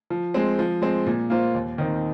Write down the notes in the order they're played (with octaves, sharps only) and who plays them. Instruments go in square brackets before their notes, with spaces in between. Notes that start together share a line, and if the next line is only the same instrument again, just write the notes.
[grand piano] F3
G#3 C4
F3
G#3 C4
A#2
A#3 F4 C5
D#2
D#3 C4 D#4